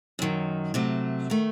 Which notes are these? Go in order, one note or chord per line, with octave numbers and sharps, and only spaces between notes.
F#2 D#3 F#3
C3 F#3 A3
D#3 A3